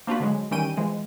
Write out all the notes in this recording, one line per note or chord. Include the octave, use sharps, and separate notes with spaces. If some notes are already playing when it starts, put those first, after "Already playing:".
A#3 C4 D4 F4 F#4 B4
D3 F#3 G#3
D#3 E3 G3 C#4 G5 D#7
E3 F3 G#3